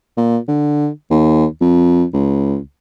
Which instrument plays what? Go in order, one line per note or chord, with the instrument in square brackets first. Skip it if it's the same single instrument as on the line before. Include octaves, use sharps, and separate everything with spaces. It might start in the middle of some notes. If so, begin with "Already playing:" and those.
[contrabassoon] A#2
D3
D#2
F2
C#2